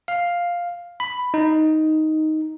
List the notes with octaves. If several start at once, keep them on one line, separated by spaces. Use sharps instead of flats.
F5
B5
D#4